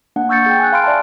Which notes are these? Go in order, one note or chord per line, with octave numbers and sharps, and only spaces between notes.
A#3 D4 F#5
C#6 E6 G6 A6 C#7
G#4 G5
G#5 E6 F#6
F5 B5 C6 F6 D7
D5 E5 A5